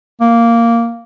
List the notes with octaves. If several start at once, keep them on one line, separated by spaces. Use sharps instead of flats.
A#3